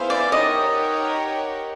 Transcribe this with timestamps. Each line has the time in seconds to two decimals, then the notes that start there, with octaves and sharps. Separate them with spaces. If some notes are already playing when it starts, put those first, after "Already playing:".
Already playing: B3 E4 G#4 C5 F5
0.10 D5
0.31 D#4 G4 A#4 C#5 D#5 F#5